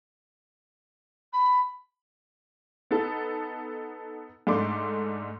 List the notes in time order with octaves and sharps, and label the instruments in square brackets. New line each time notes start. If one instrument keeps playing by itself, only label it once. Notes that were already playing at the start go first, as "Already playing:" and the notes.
[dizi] B5
[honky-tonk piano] B3 D#4 A4
G#2 A3 D4 C6 D6